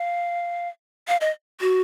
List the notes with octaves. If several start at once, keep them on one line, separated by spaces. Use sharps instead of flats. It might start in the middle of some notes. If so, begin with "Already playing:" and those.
Already playing: F5
F5
D#5
F#4